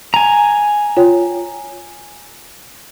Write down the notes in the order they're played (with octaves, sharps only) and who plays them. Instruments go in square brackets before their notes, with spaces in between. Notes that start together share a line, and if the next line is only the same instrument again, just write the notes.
[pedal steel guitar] G#5 A#5
[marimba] F4 C#5 G5